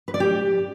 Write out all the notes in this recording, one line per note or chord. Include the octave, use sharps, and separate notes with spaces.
B4
D5
G4